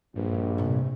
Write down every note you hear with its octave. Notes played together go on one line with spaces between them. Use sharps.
A#1 G2
A2 C3